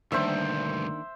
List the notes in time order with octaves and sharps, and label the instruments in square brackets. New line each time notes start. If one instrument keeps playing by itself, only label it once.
[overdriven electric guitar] D2 G2 [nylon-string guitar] D#3 A#3 D4 [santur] C5 E5